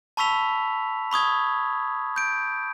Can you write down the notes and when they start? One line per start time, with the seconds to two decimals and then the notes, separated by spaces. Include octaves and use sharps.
0.17 A5 B5 C#6 E6 B6 F7
1.11 B5 C#6 D#6 G#6
2.16 G6 D7